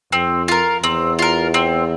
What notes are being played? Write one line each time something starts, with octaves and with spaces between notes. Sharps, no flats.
F2 C4
F4 A#4
E2 C4
F4 A#4
C4